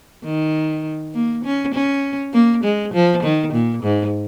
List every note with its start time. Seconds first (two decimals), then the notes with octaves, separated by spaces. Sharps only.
0.24 D#3
1.14 A#3
1.44 C#4
1.74 C#4
2.34 A#3
2.64 G#3
2.94 F3
3.23 D#3
3.53 A#2
3.83 G#2